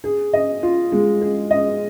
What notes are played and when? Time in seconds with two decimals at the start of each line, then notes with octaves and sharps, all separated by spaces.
0.04 G#4
0.33 D#5
0.63 F4
0.92 G#3
1.22 G#4
1.51 D#5